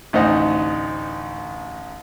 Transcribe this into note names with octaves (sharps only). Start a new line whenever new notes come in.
A1 D2 D#4 C5 D#5 F#5